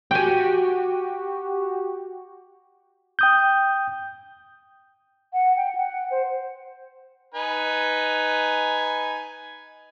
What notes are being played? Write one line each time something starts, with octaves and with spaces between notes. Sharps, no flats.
F#4 G4 G5 G#5
G5 D#6 G6
F#5
G5
F#5
C5
D#4 B4 G#5